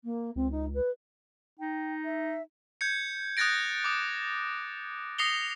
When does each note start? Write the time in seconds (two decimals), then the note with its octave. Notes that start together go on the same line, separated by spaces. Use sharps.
0.04 A#3
0.36 C#2 C4
0.51 D#4
0.75 B4
1.59 D#4 G5
2.05 E5
2.81 G6 G#6 C#7
3.37 D#6 F#6 G6 A6 A#6 D7
3.84 D6 D#6
5.18 D#6 A#6 C7 C#7 F7 G7